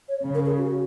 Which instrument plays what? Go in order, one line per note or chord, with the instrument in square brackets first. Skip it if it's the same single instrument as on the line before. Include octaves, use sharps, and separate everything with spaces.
[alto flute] C#5
[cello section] C#3
[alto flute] A#4
G#4
F#4